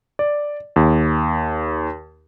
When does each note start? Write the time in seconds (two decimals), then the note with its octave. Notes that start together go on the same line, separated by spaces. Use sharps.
0.19 D5
0.76 D#2